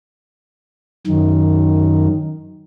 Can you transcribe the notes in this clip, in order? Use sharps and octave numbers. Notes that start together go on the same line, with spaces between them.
F#2 D#3